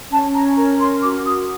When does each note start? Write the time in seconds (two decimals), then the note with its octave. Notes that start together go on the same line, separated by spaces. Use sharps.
0.11 C#4 A5
0.35 A#5
0.56 A#4 A#5
0.80 C6
1.02 F#4 D6
1.25 D#6